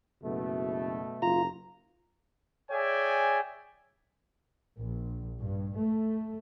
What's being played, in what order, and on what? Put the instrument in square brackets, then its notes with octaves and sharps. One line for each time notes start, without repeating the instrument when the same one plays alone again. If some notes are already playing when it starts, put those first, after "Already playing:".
[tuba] F#1 [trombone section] B2 A3
[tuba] F#1 [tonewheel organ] F4 [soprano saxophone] A#5
[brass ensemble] G#4 C#5 D5 E5 G5 G#5
[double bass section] A#1
G2
A3